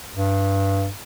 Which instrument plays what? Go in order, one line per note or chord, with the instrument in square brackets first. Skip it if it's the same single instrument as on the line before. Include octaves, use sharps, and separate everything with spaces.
[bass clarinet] G2